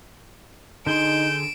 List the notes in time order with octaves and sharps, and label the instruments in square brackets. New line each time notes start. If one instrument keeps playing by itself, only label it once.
[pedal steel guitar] D3 G#4 C6 [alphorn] D#4 [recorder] G6 [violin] D7 E7